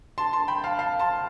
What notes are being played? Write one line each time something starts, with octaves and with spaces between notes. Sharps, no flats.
A5 C6
A5 C6
G5 B5
F5 A5
F5 A5
A5 C6